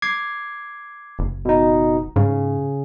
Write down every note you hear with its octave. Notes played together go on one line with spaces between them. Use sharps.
D6 G#6 C7
F#1
B2 D#4
G#2 C#3